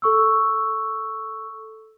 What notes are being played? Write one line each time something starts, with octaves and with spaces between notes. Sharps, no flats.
A4 C#6 E6